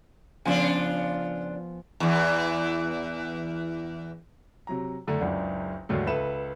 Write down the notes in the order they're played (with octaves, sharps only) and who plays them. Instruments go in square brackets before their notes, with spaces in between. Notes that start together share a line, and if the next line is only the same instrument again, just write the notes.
[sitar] C#3 D4 F4 [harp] F3 B3 G#5
[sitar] E2 E3
[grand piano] C3 F#3 A#5
F#1 D3 A3 A#5
F#1 C#2 D4
D#2 G#2 D3 F#3 A3
C#2 A4 B4 E5 E7